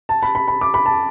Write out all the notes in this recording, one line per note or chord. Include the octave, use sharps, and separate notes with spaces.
A5
B5
B5
B5
D6
B5
A5